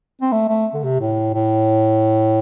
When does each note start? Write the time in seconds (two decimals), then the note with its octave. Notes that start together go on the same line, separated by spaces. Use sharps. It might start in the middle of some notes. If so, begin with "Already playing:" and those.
0.21 C4
0.32 A3
0.49 A3
0.74 D3
0.83 C3
1.01 A2
1.34 A2